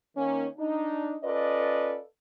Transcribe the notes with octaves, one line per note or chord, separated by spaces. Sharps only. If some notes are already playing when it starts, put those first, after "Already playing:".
D#3 A#3 C#4
D4 D#4
C#4 F4 A4 B4 D5 D#5